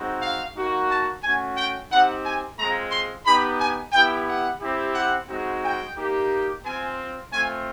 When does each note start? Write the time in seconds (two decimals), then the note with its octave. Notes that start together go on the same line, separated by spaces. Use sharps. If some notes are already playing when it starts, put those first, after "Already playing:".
Already playing: G#3 C4 D#4 F#4
0.21 F5
0.56 A#3 D#4 F#4
0.90 A5
1.22 A3 C#4 F#4 G#5
1.56 G5
1.91 C4 D#4 G4 F#5
2.24 G#5
2.57 G#3 C4 F4 A#5
2.92 C6
3.25 B3 D#4 G4 B5
3.59 G#5
3.92 B3 E4 G4 G5
4.27 F#5
4.60 C4 E4 G4
4.94 F#5
5.28 G#3 C4 D#4 F#4
5.62 G5
5.95 A#3 D#4 G4
6.63 C4 F4 G#5
7.30 A3 C4 F4 G#5